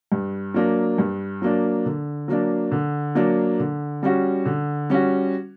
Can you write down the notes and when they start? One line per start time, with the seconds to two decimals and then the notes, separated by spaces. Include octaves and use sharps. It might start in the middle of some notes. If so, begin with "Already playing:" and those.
0.12 G2
0.54 F#3 A#3 D4
0.98 G2
1.42 F#3 A#3 D4
1.86 D3
2.28 F#3 A#3 D4
2.72 D3
3.15 F#3 A#3 D4
3.60 D3
4.03 G3 C#4 F#4
4.46 D3
4.90 G3 C#4 F#4